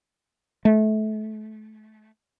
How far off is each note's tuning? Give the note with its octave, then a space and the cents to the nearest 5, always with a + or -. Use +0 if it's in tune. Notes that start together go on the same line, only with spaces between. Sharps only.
A3 -30